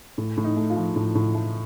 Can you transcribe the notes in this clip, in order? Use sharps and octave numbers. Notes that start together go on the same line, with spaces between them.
A2
A2
D#4
A3
F4
F3
A2
A2
A3